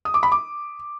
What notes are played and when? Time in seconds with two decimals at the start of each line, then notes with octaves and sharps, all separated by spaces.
0.05 D#6
0.14 D6
0.23 B5
0.32 D6